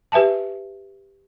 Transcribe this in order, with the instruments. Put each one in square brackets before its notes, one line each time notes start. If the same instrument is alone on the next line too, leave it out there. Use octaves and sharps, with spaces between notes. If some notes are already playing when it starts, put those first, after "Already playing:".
[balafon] G4 B4 E5 G#5 A5